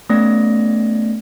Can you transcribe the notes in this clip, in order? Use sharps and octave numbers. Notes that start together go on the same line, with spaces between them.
A3 B3 C#4 D5 A#6